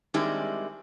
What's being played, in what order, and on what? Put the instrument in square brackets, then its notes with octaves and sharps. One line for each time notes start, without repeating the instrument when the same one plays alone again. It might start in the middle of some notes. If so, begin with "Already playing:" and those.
[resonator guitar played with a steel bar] D#3 G3 G#3 C4 D4 E4